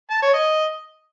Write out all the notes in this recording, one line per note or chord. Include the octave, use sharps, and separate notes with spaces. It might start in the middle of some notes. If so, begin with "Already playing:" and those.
A5
C#5
D#5